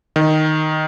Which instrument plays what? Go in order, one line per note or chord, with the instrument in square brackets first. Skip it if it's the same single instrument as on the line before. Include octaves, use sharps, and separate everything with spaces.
[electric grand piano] D#3